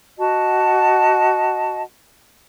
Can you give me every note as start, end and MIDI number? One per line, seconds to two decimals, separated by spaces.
0.18 1.82 66
0.18 1.82 75
0.18 1.82 78
0.18 1.82 81